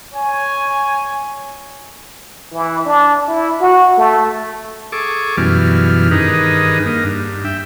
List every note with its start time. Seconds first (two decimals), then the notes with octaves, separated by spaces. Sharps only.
0.13 C#5 G#5
2.52 E3
2.86 D4
3.28 E4
3.60 F#4
3.98 A3
4.92 G#4 A4 C#6 D6
5.37 F#2 B2 E3 G3 F6
6.11 G2 D#3 D#4 G#4 B4
6.86 A#3 D#4
7.04 G2
7.45 E5 G5